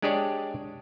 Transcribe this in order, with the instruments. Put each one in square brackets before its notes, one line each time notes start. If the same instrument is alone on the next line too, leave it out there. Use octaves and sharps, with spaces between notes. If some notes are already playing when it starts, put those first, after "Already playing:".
[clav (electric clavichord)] G#3 D4 G4 G#4 C#5 D5